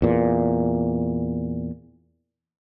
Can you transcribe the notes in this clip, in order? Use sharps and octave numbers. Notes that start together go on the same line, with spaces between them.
E2 A#2